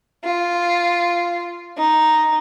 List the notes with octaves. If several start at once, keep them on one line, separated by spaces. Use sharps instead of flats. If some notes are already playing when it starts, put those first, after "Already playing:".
F4
D#4